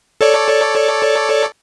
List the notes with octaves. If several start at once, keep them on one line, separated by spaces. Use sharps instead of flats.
A4 C#5 D5